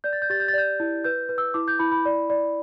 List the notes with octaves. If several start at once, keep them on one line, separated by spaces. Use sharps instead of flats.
D5 G6
A6
G6
G4 A6
G6
A6
D5 G6
E4
B4 G6
B4
E6
E4 D6
G6
E4 B5
B5
D5
D5